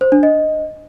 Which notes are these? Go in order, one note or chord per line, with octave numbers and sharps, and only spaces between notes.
C5
D4
D#5